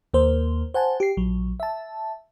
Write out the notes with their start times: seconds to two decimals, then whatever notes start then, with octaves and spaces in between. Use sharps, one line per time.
0.14 D#2 A#3 A#4 C5
0.74 C5 F#5 G#5 A5
1.00 G4 C7
1.17 A#1 F#3
1.60 E5 A5